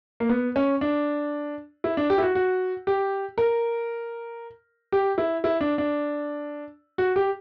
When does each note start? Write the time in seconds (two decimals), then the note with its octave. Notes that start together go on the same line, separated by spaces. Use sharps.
0.20 A#3
0.29 B3
0.56 C#4
0.81 D4
1.84 E4
1.97 D4
2.10 G4
2.18 E4
2.22 F#4
2.35 F#4
2.87 G4
3.38 A#4
4.92 G4
5.18 E4
5.44 E4
5.61 D4
5.78 D4
6.98 F#4
7.16 G4